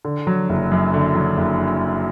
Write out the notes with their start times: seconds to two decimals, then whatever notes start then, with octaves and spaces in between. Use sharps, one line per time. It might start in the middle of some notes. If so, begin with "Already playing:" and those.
0.05 D3
0.27 F#3
0.49 F#1
0.72 F#2
0.94 D3
1.15 F#3
1.37 F#1